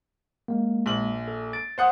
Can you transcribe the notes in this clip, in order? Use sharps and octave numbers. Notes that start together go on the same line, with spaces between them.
G#3 A#3
A#1 F#7
A4
A6 D7
C5 F#5 D#6